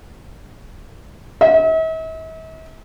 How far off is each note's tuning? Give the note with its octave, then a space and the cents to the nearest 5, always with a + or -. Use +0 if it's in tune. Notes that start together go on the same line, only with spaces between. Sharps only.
E5 -45